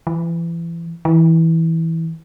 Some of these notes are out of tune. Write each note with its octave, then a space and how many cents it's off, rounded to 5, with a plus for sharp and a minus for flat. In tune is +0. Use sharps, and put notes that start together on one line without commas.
E3 +30
E3 -15